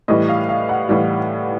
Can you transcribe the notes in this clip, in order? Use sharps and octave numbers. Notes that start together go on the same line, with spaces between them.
A2 E3 G3 D#5
F5
F5
F#5
A2 E3 G3